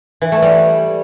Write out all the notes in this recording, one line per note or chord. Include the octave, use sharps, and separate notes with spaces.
E3
A3
G3